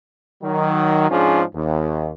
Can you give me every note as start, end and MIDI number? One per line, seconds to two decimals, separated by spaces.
0.43 1.09 51
0.43 1.09 54
1.10 1.43 44
1.10 1.43 53
1.10 1.43 61
1.10 1.43 62
1.10 1.43 65
1.10 1.43 68
1.55 2.12 39